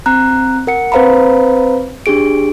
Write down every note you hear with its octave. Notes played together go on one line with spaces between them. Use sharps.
C4 A#5 F#6
A#4 F#5 C#7
C4 B4 C5 F5 A#5 B5
D4 G4 G#4 D7